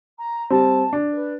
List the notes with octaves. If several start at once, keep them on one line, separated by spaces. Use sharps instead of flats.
A#5
G3 C4 A5
D4
B4